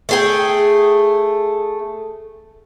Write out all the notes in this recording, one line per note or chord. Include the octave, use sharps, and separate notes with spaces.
A3 G#4 G5